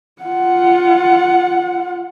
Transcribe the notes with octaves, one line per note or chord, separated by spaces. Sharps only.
F4 F#5